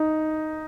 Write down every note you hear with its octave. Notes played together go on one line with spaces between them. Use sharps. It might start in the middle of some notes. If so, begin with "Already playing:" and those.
Already playing: D#4